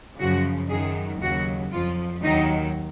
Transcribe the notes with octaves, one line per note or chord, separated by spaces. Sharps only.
F#2 C#3 F3 F#4
F#2 D#3 F#3 G#4
D#2 C#3 F#3 F#4
F2 F3 F4
D#2 D#3 F#3 D#4